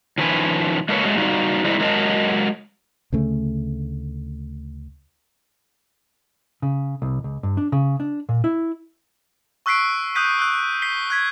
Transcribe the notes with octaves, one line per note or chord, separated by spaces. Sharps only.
D#3 F3 C#4 B4 G#5
G#3 A#3 A4 B4 C#5
F#3 G#3 A3
G3 D#4 F4 F#4
G3 G#3 C4 D#4 E4
F#3 G#3 A#4 D#5 G#5 A5
D2 C#3 A3
C#3
C2
C#2
G2
D4
C#3
D4
A#2
E4
C#6 E6 F#6 B6 C7 D7
D#6 F#6 G6 B6 D#7
E6 F#6
B6 C7 G7
F#6 G#6 B6